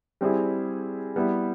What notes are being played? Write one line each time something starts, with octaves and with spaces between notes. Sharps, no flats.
G3 C4 E4 G#4
G3 B3 E4